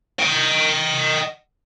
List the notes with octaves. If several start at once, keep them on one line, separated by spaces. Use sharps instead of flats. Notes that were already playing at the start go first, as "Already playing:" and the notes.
D#5 G5